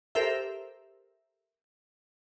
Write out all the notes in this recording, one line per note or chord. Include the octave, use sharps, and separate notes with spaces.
G4 A4 A#4 C5 E5